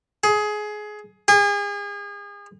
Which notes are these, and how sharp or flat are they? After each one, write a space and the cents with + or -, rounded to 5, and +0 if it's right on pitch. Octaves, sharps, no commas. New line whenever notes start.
G#4 +20
G#4 -35